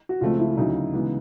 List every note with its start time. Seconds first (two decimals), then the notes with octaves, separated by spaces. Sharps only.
0.09 F#4
0.21 C#2 C#3 F3 A3 C4 F4
0.39 E4
0.57 D2 C#3 F#3 D#4
0.93 C#3 E3 G#3 B3